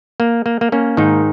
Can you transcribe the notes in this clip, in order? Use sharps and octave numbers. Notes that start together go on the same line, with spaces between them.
A#3
A#3
A#3
A#3 C#4
G#2 D#3 D#4